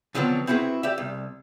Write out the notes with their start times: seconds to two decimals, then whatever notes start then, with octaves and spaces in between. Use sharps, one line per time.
0.15 D3 F3 F#3 B3 C4
0.47 C4 E4 F#4 G#4 B4
0.83 G4 D5 E5
0.98 C2